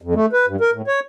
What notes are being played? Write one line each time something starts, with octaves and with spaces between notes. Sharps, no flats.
F2
A3
B4
G2
A#4
A2
C#5